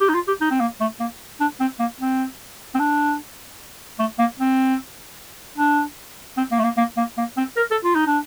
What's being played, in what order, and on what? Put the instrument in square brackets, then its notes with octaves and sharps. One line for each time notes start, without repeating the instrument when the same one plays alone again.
[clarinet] G4
D#4
F4
G4
D#4
C4
A#3
A3
A#3
D4
C4
A#3
C4
C4
D4
A3
A#3
C4
D4
C4
A#3
A3
A#3
A#3
A#3
A#3
C4
A#4
A4
F4
D#4
D4